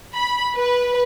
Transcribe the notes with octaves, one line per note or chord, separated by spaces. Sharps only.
B5
B4